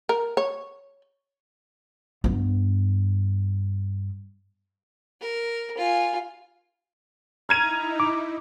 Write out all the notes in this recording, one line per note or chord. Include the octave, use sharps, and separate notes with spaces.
A#4
C#5
G2 B3
A#4
F4 G#5
D#4 E4 A#5 F6 G#6 D#7
D6